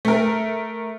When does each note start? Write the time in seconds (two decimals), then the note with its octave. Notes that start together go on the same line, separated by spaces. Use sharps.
0.05 A3 A#4